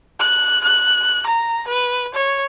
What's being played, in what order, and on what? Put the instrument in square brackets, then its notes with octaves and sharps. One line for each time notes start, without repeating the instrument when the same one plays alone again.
[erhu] F#6
F#6
A#5
B4
C#5